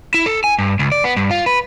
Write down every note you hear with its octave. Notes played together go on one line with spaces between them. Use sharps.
E4
A4
G#5
G2
C#2
D5
B3
G2
F4
B4